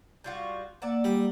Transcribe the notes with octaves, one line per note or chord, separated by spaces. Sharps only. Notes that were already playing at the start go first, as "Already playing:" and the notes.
G3 F4 F#4
A#3 D5 E5 F#5 A#5
G3